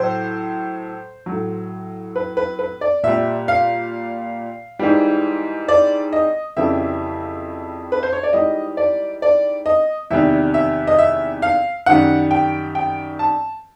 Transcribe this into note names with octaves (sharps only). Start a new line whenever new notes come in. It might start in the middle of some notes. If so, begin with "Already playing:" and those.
Already playing: A2 F#3 C5
A2 F#3
B4
B4
B4
D5
A#2 G3 E5
F5
G#2 E3 G3
D5
D#5
F2 C#3 E3 G3 E5
B4
C5
C#5
D5
G#2 E3 G3 D#5
D5
D5
D#5
E2 C3 D#3 G3 E5
E5
D#5
E5
F5
F#2 D#3 G3 F#5
G5
G5
A5